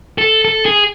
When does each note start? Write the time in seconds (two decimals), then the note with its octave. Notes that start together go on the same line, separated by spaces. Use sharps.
0.18 A4
0.45 A4
0.65 G#4